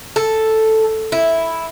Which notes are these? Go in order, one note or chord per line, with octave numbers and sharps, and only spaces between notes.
A4
E4